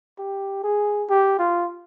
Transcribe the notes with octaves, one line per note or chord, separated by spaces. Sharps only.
G4
G#4
G4
F4